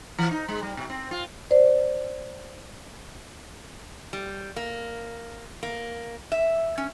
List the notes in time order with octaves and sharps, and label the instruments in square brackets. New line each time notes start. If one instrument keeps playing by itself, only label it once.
[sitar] E3
D#4
G#3
G3
B2
C4
F4
[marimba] C5 D5
[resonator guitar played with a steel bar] G3
A#3
A#3
E5
C#4